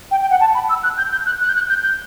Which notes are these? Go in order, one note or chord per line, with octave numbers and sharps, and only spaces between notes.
G5
G5
F#5
A5
B5
E6
F#6
G6
G6
F#6
F#6
G6
F#6
G6
G6